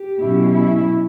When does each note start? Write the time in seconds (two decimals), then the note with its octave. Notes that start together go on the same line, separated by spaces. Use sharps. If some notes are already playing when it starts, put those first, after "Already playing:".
Already playing: G4
0.19 B2 F#3 C#4 E4
0.53 E4